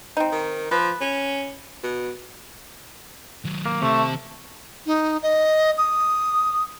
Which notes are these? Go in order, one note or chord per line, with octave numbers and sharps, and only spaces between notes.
C4 D#4
D#3
F3 B4
C#4
B2
D#3 F#3
A#3
C3 D#3 A3 A5
D#4
D#5
D#6